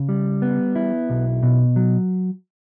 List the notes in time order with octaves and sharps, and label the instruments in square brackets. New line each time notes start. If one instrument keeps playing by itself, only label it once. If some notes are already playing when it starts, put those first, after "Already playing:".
Already playing: [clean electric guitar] C#3
G3
B3
E4
B1
B2
F#3